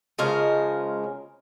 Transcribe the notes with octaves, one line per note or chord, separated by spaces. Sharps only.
C#3 F3 G#3 A#4